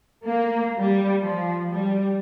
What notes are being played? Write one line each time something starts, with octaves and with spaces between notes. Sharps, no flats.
A#3
G3
F3
G3